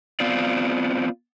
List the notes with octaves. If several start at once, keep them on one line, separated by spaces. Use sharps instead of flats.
B3 C4 F4 D5